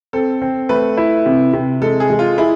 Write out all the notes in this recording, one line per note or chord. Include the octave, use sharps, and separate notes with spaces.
C4 A4
C4
A3 B4
E4
C3
C3
G#3 A4
G#4
G#3
F4
E4 G#4